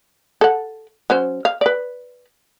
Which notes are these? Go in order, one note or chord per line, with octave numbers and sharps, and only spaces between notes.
A4 F#5
F#3 C#4 C5
F5
B4 D5